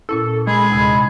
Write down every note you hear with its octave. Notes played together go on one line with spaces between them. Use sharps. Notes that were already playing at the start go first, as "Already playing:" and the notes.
A#2 C#4 E4 A4
G#3 G#4 B5
D#2 C3 E6